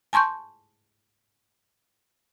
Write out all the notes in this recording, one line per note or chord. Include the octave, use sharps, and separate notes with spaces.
G#5 A5 C6 C#6 G6